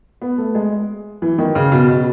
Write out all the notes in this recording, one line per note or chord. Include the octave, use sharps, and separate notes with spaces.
B3
A3
G#3
E3
D#3
C#3
B2
B2